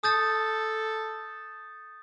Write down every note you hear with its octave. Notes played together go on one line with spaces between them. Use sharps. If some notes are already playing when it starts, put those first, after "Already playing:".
A4 D#6 G6 A6